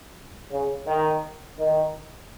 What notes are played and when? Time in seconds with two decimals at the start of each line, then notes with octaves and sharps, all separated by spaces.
0.51 C#3
0.87 D#3
1.58 D#3